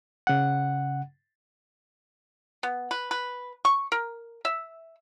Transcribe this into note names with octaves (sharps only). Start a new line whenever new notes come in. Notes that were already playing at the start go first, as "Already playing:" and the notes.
C#3 F#5
B3
B4
B4
C#6
A#4
E5